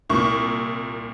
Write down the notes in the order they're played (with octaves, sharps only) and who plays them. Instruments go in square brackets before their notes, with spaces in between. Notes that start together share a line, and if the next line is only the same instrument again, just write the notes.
[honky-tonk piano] C2 A#2 C#6